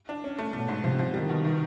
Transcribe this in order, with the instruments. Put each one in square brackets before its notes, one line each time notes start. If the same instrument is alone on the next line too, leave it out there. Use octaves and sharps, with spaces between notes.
[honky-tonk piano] D4
C#4
A3
[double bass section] B2 [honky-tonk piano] A3
[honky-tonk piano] G#2
[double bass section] C3 [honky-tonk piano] F3
[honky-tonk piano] F3
[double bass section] D#3 [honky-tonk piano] G3
[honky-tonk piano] B2
D#3